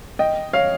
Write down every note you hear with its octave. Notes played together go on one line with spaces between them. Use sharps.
D#5 G5
C#5 F5